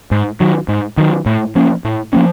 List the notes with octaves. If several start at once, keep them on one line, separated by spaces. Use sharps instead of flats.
G#2
D#3 F#3
G#2
D#3 F#3
A2
F3 A#3 C#4
A2
F3 A#3 C#4